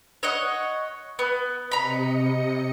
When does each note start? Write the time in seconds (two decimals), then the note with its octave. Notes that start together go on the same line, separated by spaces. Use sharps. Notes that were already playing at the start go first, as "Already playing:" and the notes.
0.23 C#5 D#5 F#5
1.19 B3
1.71 C3 D#5 A#5 B5 C#7